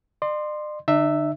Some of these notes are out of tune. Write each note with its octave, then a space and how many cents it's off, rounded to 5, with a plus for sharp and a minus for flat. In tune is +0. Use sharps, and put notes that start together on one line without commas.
D5 +45 C6 +0
D3 +0 D#4 -45 E5 +0